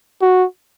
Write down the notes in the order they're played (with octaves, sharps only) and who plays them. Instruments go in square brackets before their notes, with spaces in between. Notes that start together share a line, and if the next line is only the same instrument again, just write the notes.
[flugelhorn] F#4